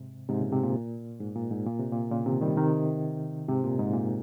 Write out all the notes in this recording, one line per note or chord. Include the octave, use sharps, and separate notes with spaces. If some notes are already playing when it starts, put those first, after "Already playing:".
Already playing: G#2 C3
G#2 C3
A#2 C#3
G#2 C3
A#2
G#2
A#2
G#2
A#2
C3
A#2
A#2 C#3
C3 D#3
D#3 G3
C3 D#3
G#2 C3
A#2
G#2
A#2